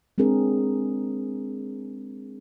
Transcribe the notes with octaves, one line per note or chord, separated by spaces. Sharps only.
G#3 C4 D4 G#4 A#4